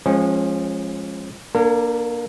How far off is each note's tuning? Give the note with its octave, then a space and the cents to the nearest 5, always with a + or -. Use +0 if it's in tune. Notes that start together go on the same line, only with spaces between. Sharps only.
F3 +0 G#3 +0 C#4 -30
A#3 +20 D4 +5 A#4 -45